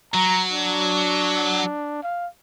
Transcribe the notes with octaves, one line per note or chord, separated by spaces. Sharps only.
F#3 A#5
D4
F5